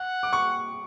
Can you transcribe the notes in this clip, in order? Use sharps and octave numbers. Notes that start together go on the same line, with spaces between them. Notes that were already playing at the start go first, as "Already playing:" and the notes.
Already playing: F#5
D6
C#6